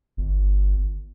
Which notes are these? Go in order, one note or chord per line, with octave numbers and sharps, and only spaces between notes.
G1